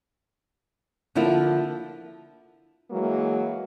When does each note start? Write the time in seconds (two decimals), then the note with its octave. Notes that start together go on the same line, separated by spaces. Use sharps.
1.15 D3 F3 A#3 E4 F4
2.90 E3 F#3 G#3 A#3